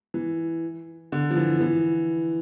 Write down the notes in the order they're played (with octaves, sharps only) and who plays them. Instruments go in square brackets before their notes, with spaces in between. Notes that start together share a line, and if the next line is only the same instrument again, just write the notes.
[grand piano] E3
D3
F3
E3
E3